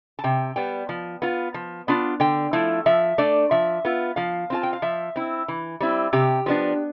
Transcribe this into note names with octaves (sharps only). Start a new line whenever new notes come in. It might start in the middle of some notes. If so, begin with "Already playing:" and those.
A5
C3 G5
G3 B3 G5
F3
B3 F4
F3
B3 D4 F4
D3 G5
F3 A3 E4
F3 E5
A3 D4 D5
F3 E5
B3 F4
F3 F5
C4 F4 A5
G5
F5
F3 E5
C4 E4
E3
G3 C4 E4
C3 G4
F3 B3 D4